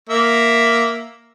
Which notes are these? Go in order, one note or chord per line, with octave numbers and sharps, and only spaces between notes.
A#3 E5